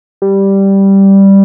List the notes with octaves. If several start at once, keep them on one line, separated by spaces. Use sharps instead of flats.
G3